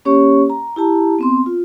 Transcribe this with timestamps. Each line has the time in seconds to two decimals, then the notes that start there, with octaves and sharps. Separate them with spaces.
0.05 A#3 C#4 G4 C#5 C#6
0.50 A#5
0.76 E4 G4 A5 A#5
1.19 B3 C4 C6
1.46 F4